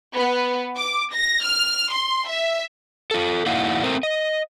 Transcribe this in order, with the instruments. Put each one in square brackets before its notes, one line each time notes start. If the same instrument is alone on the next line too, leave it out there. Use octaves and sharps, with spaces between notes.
[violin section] B3
D6
A#6
F6
C6
E5
[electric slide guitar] F4 A4
A#3 D#4 E4 D5 F5 F#5
A3 C4 A#4 C5
D#5